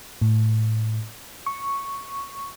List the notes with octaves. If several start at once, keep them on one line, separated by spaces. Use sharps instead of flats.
A2
C#6